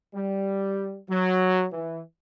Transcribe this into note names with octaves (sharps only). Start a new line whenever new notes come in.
G3
F#3
E3